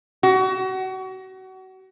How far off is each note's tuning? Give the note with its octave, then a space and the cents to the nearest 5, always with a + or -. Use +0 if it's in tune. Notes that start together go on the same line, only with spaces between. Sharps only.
F#4 +30